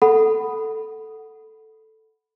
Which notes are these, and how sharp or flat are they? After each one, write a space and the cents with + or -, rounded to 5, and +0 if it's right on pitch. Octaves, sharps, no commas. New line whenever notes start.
A4 +0 F#5 +0 B5 +0